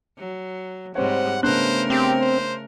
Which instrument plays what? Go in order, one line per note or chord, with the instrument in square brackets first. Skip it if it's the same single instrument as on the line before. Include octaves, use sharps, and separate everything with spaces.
[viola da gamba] F#3
[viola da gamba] G#2 G3 [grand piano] C4 C#5 [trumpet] F#5
[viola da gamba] C#3 A3 A#4 [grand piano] B3 D4 F#6 [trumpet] C5
[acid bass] C4 [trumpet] G4
[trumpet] C5